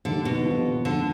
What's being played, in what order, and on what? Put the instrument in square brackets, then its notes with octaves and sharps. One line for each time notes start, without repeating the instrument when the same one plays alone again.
[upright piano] F1 D#2 D#3 [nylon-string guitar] D3
[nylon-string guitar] B2
[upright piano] D#2 D3 F3
[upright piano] F2 D#3 G#3 [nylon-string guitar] D3